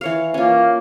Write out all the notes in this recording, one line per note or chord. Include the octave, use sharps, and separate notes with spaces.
E3 C#5 F5
A#3 C#4 F4